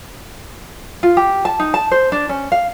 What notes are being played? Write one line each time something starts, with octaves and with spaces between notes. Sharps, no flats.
F4
G4
A5
D#4
A5
C5
D4
C#4
F5